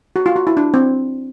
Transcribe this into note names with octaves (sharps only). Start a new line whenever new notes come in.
F#4
F4
F#4
E4
D4
C4